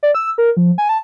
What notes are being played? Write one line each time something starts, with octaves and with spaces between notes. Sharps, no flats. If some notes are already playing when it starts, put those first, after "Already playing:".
D5
E6
A#4
F3
G#5
A5